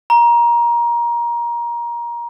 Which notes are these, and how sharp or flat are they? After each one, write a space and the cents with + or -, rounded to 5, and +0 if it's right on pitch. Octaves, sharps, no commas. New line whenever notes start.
A#5 +20